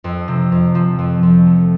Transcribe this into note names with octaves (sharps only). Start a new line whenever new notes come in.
F2
C3
F2
F3
F2
F2
A3